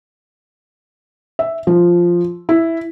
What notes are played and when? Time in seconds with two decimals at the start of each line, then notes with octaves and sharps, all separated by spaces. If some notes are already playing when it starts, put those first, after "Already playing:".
1.39 E5
1.67 F3
2.49 E4